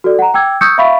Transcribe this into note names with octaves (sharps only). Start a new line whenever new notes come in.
F#4 A4 D5
F#5 A#5
G5 D6 E6 G#6
C#6 D#6 E6 G6 G#6 C#7
E5 F5 B5 C#6 A6 B6